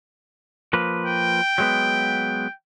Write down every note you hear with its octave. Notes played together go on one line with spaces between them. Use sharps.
F3 A#3 B4
G5
F#3 G#3 B3